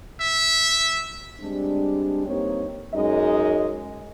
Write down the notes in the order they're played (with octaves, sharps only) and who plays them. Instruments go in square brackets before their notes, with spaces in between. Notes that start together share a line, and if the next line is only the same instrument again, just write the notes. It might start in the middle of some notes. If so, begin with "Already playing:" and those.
[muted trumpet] E5
[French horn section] G3 G#3 C4 D4
G2 A#3 C4 D#4 G4 C#5
F#2 G#3 D#4 D#5